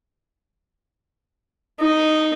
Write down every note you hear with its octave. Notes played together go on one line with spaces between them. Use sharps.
D#4